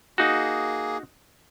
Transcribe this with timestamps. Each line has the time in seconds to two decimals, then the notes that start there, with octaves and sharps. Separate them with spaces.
0.18 A#3 D#4 F#4 G#4